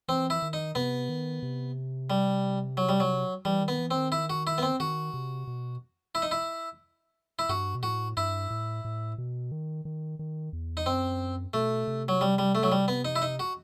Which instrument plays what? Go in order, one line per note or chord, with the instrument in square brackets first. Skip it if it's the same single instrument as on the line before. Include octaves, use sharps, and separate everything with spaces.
[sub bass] E3 [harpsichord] C4
[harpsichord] E4
[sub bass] D#3
[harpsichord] D#4
[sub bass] C3 [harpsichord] B3
[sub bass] D#3
C3
[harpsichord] G3
F#3
G3
F#3
[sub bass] E3 [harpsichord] G3
[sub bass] D#3
[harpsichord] B3
[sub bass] E3
[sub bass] D#3 [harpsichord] C4
[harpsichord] E4
F#4
E4
B3
C4
[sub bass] D#3 [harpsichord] F#4
[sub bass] C3
B2
[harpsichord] E4
D#4
E4
E4
[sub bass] G2 [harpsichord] F#4
[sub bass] B2
[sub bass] A2 [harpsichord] F#4
[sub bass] G2 [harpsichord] E4
[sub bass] A2
A2
B2
D#3
D#3
D#3
E2
[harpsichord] D#4
[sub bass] F#2 [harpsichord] C4
[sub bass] B2 [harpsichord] A3
[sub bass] C3
[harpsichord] F#3
G3
G3
A3
F#3
G3
B3
D#4
E4
D#4
F#4